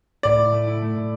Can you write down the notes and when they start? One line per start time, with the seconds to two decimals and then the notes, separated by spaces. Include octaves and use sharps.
0.23 A2 D5
0.38 E4
0.52 A3
0.67 E4
0.82 A3
0.96 A2